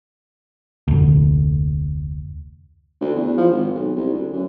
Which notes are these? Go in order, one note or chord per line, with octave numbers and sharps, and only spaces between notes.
F1 D2
D2
E2
F3
G#1
B1
C2
D2
F#2